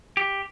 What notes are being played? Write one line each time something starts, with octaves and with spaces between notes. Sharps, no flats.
G4